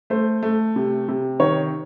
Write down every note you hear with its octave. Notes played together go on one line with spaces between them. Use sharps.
A3 C5
A3
C3
C3
D#3 C#5